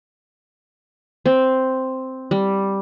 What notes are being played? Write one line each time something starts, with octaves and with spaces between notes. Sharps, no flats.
C4
G3